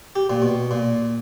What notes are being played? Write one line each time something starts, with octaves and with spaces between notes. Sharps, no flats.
G4
A#2
B2
A#2